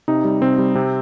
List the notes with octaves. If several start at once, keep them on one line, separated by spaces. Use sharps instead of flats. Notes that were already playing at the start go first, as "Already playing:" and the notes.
C3 D#4
G3
C3 C4
G3
C3